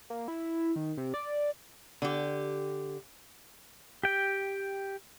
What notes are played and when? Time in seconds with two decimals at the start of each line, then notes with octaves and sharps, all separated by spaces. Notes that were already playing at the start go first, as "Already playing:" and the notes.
0.10 A#3
0.28 E4
0.76 D#3
0.97 C3
1.14 D5
2.02 D3 G4
4.03 G4 G5